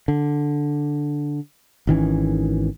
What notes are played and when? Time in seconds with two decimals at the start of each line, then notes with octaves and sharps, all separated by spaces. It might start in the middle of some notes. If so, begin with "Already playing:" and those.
0.08 D3
1.87 G#1 D#3 E3 C#4